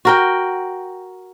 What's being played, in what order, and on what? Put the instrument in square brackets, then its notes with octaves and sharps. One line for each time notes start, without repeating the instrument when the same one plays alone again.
[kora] F#4 A#4 G5